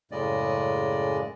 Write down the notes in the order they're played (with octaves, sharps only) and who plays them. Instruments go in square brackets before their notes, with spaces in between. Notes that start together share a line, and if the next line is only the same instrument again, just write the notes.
[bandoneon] F#2 A2 C#3 G#3 D5 D#5